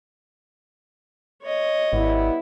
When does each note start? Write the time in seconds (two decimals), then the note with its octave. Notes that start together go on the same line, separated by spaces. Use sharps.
1.43 C#5 D#5
1.93 G#1 G3 B3 E4